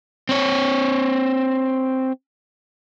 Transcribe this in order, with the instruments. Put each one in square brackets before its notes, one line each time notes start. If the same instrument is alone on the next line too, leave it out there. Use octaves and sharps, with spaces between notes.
[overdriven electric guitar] C4 C#5